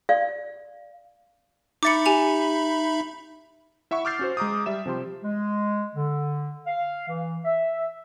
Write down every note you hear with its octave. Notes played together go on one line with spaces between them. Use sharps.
D5 F5
D#4 E5 B5 D6 A6 C#7
G4 G#5 F7
E4 E5 F#5 C#6
D6 E6 F6 G6 A6 C7
C#4 F#4 C5
G#3 A#5 D6 D#6
G3 E5 E7
C3 F3 G4 C6
G#3
D3
F5
E3
E5